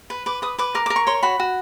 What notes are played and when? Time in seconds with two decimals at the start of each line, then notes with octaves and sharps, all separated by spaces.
0.10 B4
0.26 B4 D6
0.42 B4 D#6
0.58 B4 D6
0.75 A#4 D6
0.86 D6
0.90 A#4
0.96 C#6
1.07 C#5 C6
1.23 F#4 B5
1.39 F#4